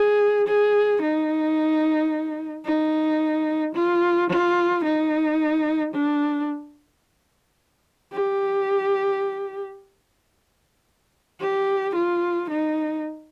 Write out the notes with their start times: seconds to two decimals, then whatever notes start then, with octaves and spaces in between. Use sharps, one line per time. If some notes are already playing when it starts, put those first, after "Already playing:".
Already playing: G#4
0.47 G#4
1.02 D#4
2.65 D#4
3.75 F4
4.30 F4
4.84 D#4
5.94 D4
8.13 G4
11.41 G4
11.95 F4
12.50 D#4